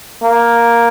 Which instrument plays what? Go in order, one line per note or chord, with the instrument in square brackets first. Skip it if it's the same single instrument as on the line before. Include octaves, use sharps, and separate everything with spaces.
[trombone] A#3